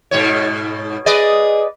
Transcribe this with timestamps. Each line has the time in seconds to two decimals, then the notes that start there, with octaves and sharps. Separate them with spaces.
0.11 G#2 B2 C#5
1.06 G#4 B4 D5 D#5